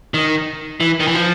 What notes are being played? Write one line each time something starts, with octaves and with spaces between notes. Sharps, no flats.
D#3
E3
D#3
E3
F3